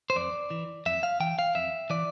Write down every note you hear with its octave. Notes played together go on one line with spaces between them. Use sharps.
C5
F2 D5
E3
F2 E5
F5
E3 G5
F5
F2 E5
E3 D5